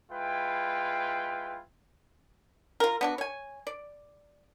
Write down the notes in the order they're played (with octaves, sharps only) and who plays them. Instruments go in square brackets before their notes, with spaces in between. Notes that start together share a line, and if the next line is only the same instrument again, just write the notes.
[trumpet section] G#3 E4 F4 B4 G5
[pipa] F4 A#4
B3 D4 F#4
C#5 G#5
D5